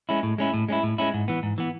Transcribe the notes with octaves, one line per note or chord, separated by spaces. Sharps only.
G#3 C#4 E4
A2
G#3 C#4 E4
A2
G#3 C#4 E4
A2
G#3 C#4 E4
G#2
E3 B3
G#2
E3 B3